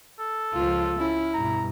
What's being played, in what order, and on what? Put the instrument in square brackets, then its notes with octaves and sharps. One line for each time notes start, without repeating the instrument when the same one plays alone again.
[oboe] A4
[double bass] C#2 F3 [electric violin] F4
[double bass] C#4 [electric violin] E4
[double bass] G2 B2 [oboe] A#5